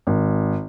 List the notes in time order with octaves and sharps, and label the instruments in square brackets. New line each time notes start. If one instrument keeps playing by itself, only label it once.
[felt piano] G#1